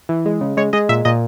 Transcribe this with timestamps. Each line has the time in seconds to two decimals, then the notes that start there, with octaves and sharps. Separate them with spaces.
0.09 E3
0.26 G#3
0.41 C#3
0.57 G#3 C#5
0.73 G#3 D#5
0.89 A#2 E5
1.05 A#2 D#5